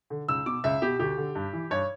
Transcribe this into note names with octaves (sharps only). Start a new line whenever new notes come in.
D3
C#2 E6
B2 D6
C#2 E5
B2 G4
D2 G4
D3
G2
E3
G2 C#5